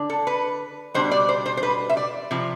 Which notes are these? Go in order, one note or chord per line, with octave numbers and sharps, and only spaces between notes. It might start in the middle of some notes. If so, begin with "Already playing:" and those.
Already playing: D3 D4
A4
B4
B2 G3 D4 C5
D5
C5
C5
C5
B4
E5
D5
C3 F3